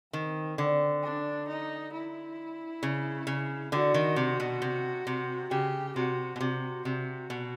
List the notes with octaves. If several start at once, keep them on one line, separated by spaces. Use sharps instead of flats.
D#3 C4
D3
D4
D#4
E4
C#3
C#3
D3 F#4
D#3
C3
B2
C3
C3
C#3 G4
C3 F#4
B2
C3 F#4
C3
B2